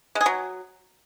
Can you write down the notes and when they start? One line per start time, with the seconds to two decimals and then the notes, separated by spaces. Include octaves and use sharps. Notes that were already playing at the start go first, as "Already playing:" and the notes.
0.15 G#3
0.21 G#4
0.26 F#3